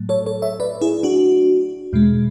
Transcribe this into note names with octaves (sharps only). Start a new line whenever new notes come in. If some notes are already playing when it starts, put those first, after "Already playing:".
Already playing: A2 F#3 A3
A4 C#5
A4 C#5
C#5 E5
B4 D5
E4 G#4
D4 F#4
E2 B2 G#3